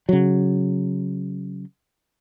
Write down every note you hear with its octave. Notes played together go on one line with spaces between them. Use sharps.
C#3 F#3